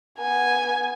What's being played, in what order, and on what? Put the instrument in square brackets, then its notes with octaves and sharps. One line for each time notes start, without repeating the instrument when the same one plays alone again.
[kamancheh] B3 G#5